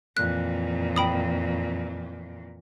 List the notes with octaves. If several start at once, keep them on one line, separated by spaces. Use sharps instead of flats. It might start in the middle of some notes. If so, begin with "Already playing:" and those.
F2 A#2 E3 F#6
G5 B5 D#6